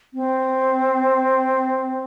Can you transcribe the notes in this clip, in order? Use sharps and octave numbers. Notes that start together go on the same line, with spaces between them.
C4